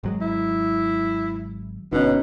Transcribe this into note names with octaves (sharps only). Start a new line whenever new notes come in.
G#1 F#3 G#3
E4
F#1 B2 D3 C#4 D#4